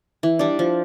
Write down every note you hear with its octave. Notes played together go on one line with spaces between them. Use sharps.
E3
G3 D4
F3